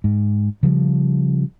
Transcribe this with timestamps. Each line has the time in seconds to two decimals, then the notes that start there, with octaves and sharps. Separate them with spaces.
0.04 G#2
0.63 C#3 F3 G3